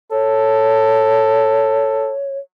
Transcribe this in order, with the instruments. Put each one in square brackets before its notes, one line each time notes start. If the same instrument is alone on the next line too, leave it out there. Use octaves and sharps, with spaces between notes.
[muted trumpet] A4 [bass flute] C#5